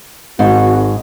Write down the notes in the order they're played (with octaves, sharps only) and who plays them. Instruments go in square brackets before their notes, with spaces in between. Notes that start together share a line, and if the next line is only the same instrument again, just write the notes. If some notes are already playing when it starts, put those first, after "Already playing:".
[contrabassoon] G#1 [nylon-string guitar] G#2 [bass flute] F#4